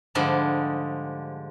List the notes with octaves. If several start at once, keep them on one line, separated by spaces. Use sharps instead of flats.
G#2 D3 F3 G3 G#3